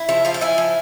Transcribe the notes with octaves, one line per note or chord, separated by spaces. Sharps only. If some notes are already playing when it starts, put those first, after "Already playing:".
Already playing: E4
F3 E5
F3 F5
G5
E4 G#5
F3